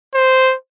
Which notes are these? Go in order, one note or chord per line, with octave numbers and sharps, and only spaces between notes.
C5